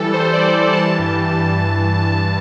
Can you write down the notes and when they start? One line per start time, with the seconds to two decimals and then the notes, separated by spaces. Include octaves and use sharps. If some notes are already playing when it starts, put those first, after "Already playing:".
Already playing: E3 G3 A4
0.14 C5
0.20 G3
0.33 D5
0.46 G3
0.73 E3 A5
0.99 G2
1.25 E3
1.51 G2
1.78 G2
2.04 E3